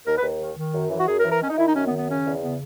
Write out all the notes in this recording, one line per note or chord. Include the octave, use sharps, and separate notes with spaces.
D#2 A#4
B4
D#2
D#3
D#3
F#2
E3
F#4
F#2 G#4
A#4
E3
A#4
D#3 C#4
D#4
D#3 E4
D#4
F#2 C#4
B3
D#3
B3
C#3 C#4
E2
C#3 B3